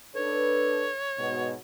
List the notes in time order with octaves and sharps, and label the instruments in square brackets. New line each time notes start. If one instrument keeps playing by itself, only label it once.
[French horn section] D4 A4 B4 [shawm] C#5
[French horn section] G#2 B2